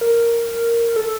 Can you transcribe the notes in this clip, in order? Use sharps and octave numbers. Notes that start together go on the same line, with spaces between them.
A#4
A4